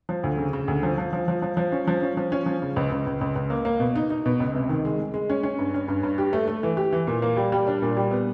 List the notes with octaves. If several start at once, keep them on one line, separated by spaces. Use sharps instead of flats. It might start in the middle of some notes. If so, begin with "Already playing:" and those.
F3
D2
C#3
C#3
D2
F3
F3
F3
F3
F3
F3
C#4
F3
C#4
F3
C#4
F3
C#3
C#2
C#2
C#2
C#2
C#2
A#3
A#3
B2
D#4
D#4
B2
C#2
C3
D#3
G#3
G#3
G#3
C#4
C#4
G2
C#4
G2
G2
G4
A3
A3
E3
G4
E3
A#2
A#3
G3
G3
D4
A#2
G3
B3